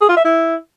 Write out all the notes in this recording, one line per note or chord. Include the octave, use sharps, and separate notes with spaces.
G#4
F4
E5
E4